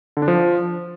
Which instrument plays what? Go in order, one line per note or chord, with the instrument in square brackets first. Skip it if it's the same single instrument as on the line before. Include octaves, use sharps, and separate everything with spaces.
[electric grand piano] D3
D4
F3